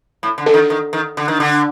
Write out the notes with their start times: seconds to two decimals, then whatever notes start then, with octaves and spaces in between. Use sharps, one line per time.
0.23 A2
0.38 D3
0.46 A4
0.54 D#3
0.70 D#3
0.93 D#3
1.17 D3
1.28 D#3
1.40 D3